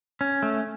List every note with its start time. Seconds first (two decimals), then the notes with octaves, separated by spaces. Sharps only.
0.21 C#4
0.43 A3